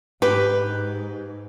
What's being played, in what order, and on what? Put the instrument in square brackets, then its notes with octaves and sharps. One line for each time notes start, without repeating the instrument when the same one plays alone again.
[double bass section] G#2 [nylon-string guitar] G4 [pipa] B4